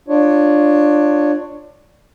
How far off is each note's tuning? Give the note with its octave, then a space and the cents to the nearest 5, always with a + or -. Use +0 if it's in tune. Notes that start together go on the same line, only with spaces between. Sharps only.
D4 +15 F4 +0 C#5 +0